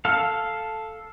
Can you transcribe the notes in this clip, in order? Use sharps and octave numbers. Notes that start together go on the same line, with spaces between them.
A4 F5